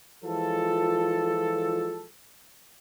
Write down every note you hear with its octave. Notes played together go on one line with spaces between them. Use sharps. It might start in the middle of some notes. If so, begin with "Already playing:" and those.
E3 F3 G#3 F4 A4